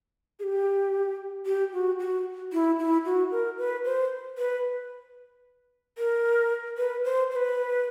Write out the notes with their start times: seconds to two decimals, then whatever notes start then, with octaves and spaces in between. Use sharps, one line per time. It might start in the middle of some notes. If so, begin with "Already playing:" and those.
0.40 G#4
0.43 G4
1.46 G4
1.73 F#4
1.99 F#4
2.53 E4
2.79 E4
3.05 F#4
3.32 A#4
3.58 B4
3.85 C5
4.38 B4
5.98 A#4
6.78 B4
7.04 C5
7.31 C5
7.36 B4